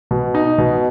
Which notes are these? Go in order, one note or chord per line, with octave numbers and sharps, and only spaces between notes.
B2
D#4
B2